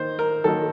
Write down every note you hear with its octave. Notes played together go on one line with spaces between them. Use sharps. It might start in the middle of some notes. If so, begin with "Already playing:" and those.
Already playing: D#3 A#3 D#4 C5
A#4
D#3 F#3 A#3 D#4 A4